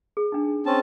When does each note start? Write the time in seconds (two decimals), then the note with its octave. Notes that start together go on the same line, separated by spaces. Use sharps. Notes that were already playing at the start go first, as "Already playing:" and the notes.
0.17 G#4
0.32 D4 D#4
0.66 C4 C#4 A5